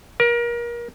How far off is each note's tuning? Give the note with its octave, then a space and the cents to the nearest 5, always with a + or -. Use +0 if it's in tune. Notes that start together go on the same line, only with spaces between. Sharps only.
A#4 +30